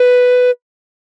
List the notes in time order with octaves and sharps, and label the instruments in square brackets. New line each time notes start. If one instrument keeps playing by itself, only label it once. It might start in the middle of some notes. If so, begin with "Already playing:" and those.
Already playing: [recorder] B4